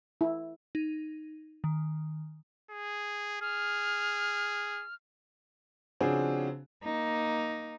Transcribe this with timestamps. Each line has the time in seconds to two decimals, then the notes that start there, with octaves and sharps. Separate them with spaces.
0.21 E4
0.75 D#4
1.64 D#3
2.71 G#4
3.41 G#4 F6
6.01 C#3 F3 C4 D4 F#4 G#4
6.83 A#3 D#4